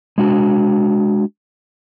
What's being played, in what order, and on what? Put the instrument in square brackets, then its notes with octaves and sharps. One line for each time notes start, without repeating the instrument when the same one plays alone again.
[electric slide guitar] G#3 D4 F#4